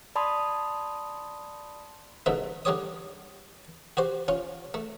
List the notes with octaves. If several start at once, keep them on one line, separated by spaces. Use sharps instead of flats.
D5 A5 B5 C6 D#6
C2 G#2 B2 D3 E5
D3 G3 G4 C#5 D#6
F#4 G4 C5
C#4 F4
A3